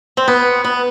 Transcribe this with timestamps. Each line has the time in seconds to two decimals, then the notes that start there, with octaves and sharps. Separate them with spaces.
0.17 C4
0.28 B3
0.64 B3